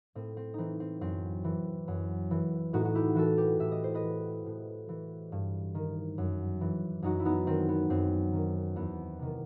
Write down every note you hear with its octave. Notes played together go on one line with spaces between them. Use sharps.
A2 C4
C4
E3 C4 D#4
C4
F#2 C4
E3
F#2
E3
A2 D#4 F#4
F#4
E4 G4
E3 F#4 A4
G4 B4
A2 E5
D#5
C5
B4 D#5
E3
A2
E3
G2
D#3
F#2
E3
F#2 D#4 F#4
E4
B3 D#4
D#3 C4
B3
F#2 C4
D#3
E2 B3
C3 D#3